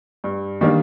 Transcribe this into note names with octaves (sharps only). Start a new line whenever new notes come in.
G2
D#3 G3 A#3 D4